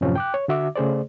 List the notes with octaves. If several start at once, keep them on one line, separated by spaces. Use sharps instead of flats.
F#2 A2 C3 F3 C#4
G5 D6 F#6
C#5
D3 F#4 E5 D6
C#3 A3 G#4 C5 D5